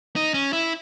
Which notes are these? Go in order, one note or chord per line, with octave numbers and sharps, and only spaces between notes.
D#4
C#4
E4